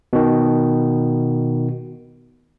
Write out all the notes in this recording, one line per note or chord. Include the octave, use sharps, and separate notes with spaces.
B2 D#3